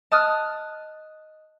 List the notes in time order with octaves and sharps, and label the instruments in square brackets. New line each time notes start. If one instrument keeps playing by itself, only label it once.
[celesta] D#5 F#6 [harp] A5 D#6 F6